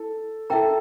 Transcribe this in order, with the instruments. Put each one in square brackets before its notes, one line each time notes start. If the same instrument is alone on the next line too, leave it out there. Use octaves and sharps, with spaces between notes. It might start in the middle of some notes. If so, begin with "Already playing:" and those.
Already playing: [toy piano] E4 [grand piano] A4
[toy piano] E4 A#4 E5 G5 A#5 [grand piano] A4